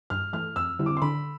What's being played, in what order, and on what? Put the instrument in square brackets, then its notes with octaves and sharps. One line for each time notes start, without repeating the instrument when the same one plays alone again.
[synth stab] G2 [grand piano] F6
[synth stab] E3 A3 [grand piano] F6
[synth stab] F2 [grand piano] E6
[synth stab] D3 G3 C4 E4
[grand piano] D6
C6
[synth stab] D3 [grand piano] B5